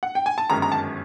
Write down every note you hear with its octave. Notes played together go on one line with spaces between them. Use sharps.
F#5
G5
G#5
A5
G1 F#2 D#3 G#3 C#4 A#5
A#5
A5